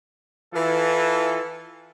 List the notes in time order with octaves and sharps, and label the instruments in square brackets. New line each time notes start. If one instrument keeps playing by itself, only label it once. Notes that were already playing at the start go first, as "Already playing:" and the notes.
[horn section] E3 F4 A4